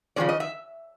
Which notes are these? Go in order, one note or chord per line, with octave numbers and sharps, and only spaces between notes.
C#3 F3 G#3 C#4 D5
D#5
E5